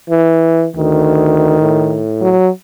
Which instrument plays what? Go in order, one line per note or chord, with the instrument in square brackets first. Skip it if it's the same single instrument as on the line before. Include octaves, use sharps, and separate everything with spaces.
[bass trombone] E3
[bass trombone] D2 [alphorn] D#3
[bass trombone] A2
[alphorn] F#3